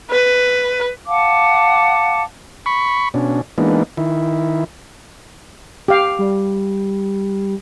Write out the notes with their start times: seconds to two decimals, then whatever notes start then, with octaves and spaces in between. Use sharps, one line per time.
0.10 B4
1.05 F5 F#5 A5 D6
2.66 B5 C#6
3.14 B2 C#4 D4
3.58 E3 G#3 A#3 B3 D4 D#4
3.97 D#3 E4
5.88 G4 F5
6.19 G3